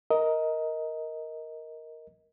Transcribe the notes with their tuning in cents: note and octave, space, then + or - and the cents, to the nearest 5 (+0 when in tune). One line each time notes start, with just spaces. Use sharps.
A#4 +0 D#5 +20